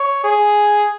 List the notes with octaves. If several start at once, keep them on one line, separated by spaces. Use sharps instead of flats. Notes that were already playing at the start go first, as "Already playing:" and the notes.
Already playing: C#5
G#4